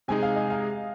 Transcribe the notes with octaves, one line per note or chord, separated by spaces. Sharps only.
C3 G#3 D#4 G#4 G#5
F5
D#5
F5